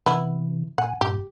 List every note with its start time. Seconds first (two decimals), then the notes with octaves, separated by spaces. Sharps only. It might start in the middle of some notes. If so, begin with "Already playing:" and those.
0.06 C3 E3 B3 E4
0.78 A#2 F#5 G#5
1.01 G2 A#2 G4